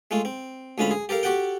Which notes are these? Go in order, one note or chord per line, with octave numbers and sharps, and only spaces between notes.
G#3 A3 F4
C4
D2 G#3 C#4 F4 B5
G#4
G4 A4 A#4 F5
F#4 G4 A4 F#5 G5